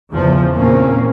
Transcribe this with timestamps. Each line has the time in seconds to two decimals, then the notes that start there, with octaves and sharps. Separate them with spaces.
0.11 E2 C#3 F3
0.54 E2 A#2 A#3 C4 C#4